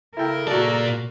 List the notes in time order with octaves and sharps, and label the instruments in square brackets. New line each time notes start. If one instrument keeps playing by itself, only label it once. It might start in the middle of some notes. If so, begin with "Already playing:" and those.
[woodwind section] C#3 A4 [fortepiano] E4 G5 [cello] A#4
[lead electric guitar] A#2 D5 [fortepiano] F#4 A5